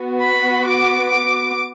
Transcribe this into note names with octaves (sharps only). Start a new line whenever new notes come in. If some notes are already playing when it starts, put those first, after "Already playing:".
Already playing: B3 F#4
B5
D6
D6